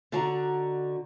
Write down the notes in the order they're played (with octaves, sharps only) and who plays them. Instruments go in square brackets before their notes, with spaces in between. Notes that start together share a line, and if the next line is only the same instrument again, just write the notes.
[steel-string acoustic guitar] D3 D4 D#4 F#4 D5 A#5